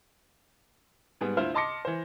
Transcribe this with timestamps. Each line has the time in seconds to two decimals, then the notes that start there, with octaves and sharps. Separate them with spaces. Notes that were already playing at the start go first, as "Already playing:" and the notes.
1.21 G#2 G3 B3 G#4
1.37 D2 E4 F4 C5 F6
1.54 D#5 A5 C6 D6 A#6 C#7
1.85 E3 C5